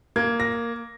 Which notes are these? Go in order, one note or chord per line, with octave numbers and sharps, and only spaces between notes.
A#3 G#6
A#6